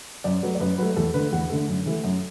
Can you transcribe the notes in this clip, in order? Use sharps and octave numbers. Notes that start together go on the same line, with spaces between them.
F#2 D5
F#3 A3 B4
D5
F#2 B4
F#3 A3 B4
E2 A4
D3 A3 B4
E2 F#5
D3 A3
F#2
E3 A3
F#2